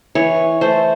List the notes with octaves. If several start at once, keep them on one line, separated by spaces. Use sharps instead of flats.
E3 C#5
A3 C5